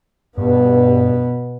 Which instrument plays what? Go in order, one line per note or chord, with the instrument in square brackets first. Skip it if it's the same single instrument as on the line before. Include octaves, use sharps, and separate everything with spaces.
[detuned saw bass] G2 [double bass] B2 B3